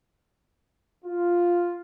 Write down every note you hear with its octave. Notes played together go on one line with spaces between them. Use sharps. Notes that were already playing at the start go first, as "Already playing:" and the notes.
F4